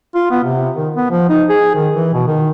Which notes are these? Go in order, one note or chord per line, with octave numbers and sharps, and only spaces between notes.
F4
B3
C3
D#3
B3
F3
D#4
G#4
D#3
E3
B2
D#3